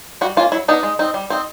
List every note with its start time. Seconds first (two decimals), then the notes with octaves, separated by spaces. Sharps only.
0.21 G3 F#4
0.37 A#3 C#4 F4
0.52 F#3 E4
0.68 B3 D4 D#4
0.83 G#3
0.99 C4 D#4
1.14 G3
1.30 C4 D#4